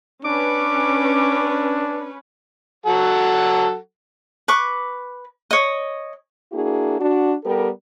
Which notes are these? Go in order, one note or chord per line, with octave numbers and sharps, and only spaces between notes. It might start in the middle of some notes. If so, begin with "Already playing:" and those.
C#4 D4 B4 D6
F#3 A4 F#5
B4 C#6 D6
C#5 D#5
A#3 D4 E4 F#4 G#4
D4 F#4
G3 B3 G4 A4 A#4